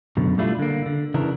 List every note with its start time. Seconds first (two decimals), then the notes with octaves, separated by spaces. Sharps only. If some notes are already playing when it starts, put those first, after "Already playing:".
0.17 F#2 B2 D3
0.38 G3 A3 D4 E4 F4
0.59 D3 A#3
0.86 D3
1.14 C#3 E3 D4 A#4